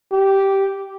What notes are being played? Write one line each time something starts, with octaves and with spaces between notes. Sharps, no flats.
G4